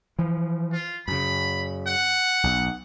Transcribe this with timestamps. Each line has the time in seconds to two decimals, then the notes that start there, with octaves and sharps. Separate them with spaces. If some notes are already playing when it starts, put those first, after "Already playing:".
0.19 E3 F3
0.72 F4
1.08 F#2 C#3 B5
1.87 F#5
2.44 B1